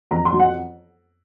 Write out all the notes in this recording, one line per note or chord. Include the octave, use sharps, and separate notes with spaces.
F2 A#5
C6
F#3
F#5